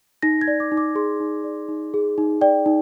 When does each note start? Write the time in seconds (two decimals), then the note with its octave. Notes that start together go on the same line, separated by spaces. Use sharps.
0.22 D#4 A#6
0.41 G#6
0.48 D5
0.60 D6
0.72 D#4
0.77 D6
0.95 G#4 C6
1.20 D#4
1.44 D5
1.68 D#4
1.94 G#4
2.18 D#4
2.41 D5 G5
2.66 D#4